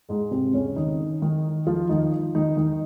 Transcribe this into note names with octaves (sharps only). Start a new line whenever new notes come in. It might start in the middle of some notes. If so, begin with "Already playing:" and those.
G#2 G#3
C3 C4
C#3 C#4
D#3 D#4
D#3 D#4
F3 F4
D#3 D#4
D#3 D#4
D#3 D#4